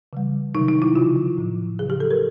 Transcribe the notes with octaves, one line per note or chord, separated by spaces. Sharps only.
C#3 E3 G3
C3 D#3 F#3 D#4
D#4
E4
C#3 F3 F4
A2 F3
C#3 F#3 G#4
G4
A4
A#4